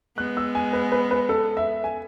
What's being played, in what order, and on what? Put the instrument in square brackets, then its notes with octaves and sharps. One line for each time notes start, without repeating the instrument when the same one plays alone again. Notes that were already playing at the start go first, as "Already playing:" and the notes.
[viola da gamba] G#3 B3 [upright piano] F#6
[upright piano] E6
G#5
B4
B4
B4
A4
E5
G#5